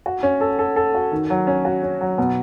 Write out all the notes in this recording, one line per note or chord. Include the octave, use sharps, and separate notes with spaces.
F#4
C#4
A4
A4
A4
F#4
D#3
F#3
C#4
F#4
C#4
F#3
B2